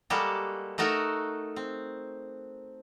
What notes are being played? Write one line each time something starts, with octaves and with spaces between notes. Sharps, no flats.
G3 G#3 A#3 F#4 G4 A4
A3 D#4 F#4 A4 A#4
C4